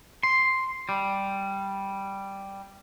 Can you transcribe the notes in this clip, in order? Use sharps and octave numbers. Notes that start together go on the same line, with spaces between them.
C6
G3